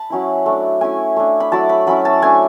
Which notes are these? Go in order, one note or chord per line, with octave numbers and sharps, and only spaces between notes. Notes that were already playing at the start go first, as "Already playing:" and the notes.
Already playing: A5 B5
F#3 C#4 E4
A3 D4
A3 C#4 E4 G#5
A3 D4
B5
F#3 A3 E4 A5
B5
F#3 C#4 E4 B5
A5
A3 D4 G#5